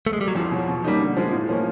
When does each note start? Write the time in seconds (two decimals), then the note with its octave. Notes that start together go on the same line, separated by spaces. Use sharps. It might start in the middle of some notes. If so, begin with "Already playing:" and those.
0.07 A3
0.13 G#3
0.21 G3
0.28 F#3
0.35 E2 F3
0.51 B2 F#3
0.68 B2
0.84 G3 A#3 D#4 G4
1.01 D3
1.17 F3 G#3
1.33 A2
1.49 F3 A#3 C#4